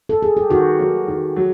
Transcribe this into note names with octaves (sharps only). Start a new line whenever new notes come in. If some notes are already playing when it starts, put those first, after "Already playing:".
A4
G#4
G4
D#3 F#4
F#3 A#3
D#3
F#3